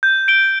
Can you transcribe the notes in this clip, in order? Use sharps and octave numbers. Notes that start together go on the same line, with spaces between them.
G6
D7 G7